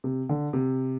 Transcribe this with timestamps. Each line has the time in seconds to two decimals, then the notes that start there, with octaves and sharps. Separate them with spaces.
0.04 C3
0.29 D3
0.53 C3